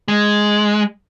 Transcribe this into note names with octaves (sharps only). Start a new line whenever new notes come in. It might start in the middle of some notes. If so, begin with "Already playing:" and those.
G#3